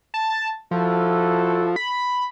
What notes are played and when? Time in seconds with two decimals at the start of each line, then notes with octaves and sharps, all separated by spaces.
0.14 A5
0.71 F3 E4 F#4 A4
1.76 B5